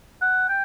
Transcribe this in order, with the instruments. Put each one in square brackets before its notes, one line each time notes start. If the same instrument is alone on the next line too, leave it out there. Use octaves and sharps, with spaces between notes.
[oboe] F#5
G5